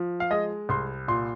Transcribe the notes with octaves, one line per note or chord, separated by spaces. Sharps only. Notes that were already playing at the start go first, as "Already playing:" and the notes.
Already playing: F3
F5
G#3 D#5
C2 C6
A#2 C6